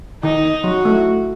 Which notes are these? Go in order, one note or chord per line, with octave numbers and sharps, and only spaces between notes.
D#3 D#4
F#3 F#4
A3